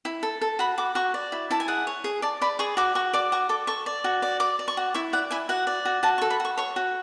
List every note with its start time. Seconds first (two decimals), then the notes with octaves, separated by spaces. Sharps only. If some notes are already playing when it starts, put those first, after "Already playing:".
0.05 E4
0.23 A4
0.41 A4
0.59 F#4 B5
0.78 F#4 D6
0.95 F#4 C#6
1.14 D5
1.32 E4
1.51 E4 A5
1.60 G#5
1.68 G#4 F#5
1.87 C#5
2.04 G#4
2.22 D5 A5
2.41 D5 B5
2.59 G#4 C#6
2.77 F#4 D6
2.95 F#4 C#6
3.13 D5 D6
3.32 F#4 C#6
3.49 A4 D6
3.67 A4 C#6
3.86 D5
4.04 F#4
4.22 D5
4.40 D5 D6
4.59 D5
4.68 C#6
4.77 F#4
4.94 E4 C#6
5.13 D5 F#5
5.31 E4 G#5
5.49 F#4 F#5
5.67 D5
5.85 F#4
6.03 F#4 A5
6.18 C#6
6.22 A4
6.30 B5
6.40 F#4 C#6
6.57 C#5 C#6
6.76 F#4